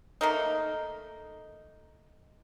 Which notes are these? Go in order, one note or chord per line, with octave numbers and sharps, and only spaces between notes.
A3 A#3 D#4